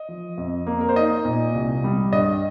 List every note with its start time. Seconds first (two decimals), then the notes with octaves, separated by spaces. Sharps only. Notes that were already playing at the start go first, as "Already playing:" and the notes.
Already playing: D#5
0.09 F3
0.38 F2
0.67 A#3
0.81 A#4
0.89 C5
0.96 D#4 D#5
1.25 A#2
1.54 C2
1.84 G3
2.12 G2 D#5